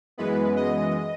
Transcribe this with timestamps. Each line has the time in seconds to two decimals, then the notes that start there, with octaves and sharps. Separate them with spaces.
0.18 F#2 E3 G#3 B3 B4
0.56 D#5